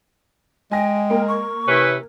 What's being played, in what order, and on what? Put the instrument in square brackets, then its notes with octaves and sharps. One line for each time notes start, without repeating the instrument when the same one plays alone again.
[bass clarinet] G#3 [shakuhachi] G5 [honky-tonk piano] G#5 A#6
[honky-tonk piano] A#3 A#4
[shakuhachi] C#6
[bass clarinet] C3 [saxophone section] E3 C#4 B4